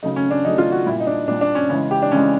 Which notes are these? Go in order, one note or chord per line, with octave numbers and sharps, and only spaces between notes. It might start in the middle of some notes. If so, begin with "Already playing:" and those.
C#3 F#3 A3 D#4
C#4
D4
C#3 F#3 A3 D#4
F4
F#4
A#2 G3 E4
D#4
D4
A#2 G3 D4
D4
C#4
C#3 E3 G#3 C#4
G4
D4
C#3 E3 G#3 C#4